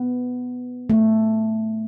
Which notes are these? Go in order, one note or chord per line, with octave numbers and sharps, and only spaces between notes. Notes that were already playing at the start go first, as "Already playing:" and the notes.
Already playing: B3
A3